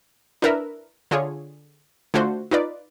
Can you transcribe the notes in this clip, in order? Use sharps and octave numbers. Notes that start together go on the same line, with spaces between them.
D4 E4 A#4 B4 E5
D3 F4 G#4 C#5
D3 A3 F4 F#4 C5
D#4 F4 B4 D5